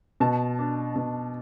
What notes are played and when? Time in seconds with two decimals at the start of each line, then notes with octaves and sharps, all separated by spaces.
0.20 B2 A5
0.59 D4
0.96 B2